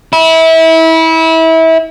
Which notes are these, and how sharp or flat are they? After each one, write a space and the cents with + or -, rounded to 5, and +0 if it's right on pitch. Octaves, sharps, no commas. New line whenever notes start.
E4 -25